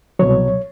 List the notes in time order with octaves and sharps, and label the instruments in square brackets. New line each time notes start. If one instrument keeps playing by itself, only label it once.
[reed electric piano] C2 B2 F#3 C#5